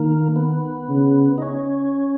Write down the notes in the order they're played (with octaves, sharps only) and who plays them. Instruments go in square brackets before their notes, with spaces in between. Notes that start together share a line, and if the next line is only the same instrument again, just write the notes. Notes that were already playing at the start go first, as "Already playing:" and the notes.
Already playing: [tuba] D#3 [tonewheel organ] A#3
[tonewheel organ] B3
[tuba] C#3
[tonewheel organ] D#4
C#4